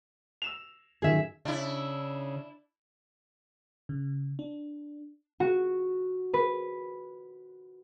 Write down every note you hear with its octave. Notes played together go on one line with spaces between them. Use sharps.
E6 E7 F7
F#2 A#2 D#3 G#4 E5
C#3 D4 E4
C#3
D4
F#4
B4